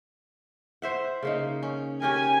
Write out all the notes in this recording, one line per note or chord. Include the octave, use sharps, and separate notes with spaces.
C5 E5 F#5
C#3 A#3 D#4
C#4
C#4 G4 A#4 G#5